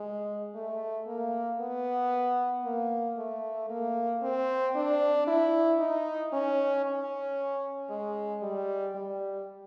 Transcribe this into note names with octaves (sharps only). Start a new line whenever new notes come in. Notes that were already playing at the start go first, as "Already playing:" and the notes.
Already playing: G#3
A3
A#3
B3
A#3
A3
A#3
C4
D4
E4
D#4
C#4
C#4
G#3
G3
G3